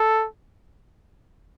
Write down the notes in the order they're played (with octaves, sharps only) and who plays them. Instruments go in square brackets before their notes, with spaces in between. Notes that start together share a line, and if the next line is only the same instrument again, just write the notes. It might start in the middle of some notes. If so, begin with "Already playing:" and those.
Already playing: [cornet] A4